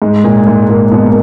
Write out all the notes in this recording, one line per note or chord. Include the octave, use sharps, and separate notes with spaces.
G#2 G#3
A#2 A#3
G#2 G#3
A#2 A#3
B2 B3
A#3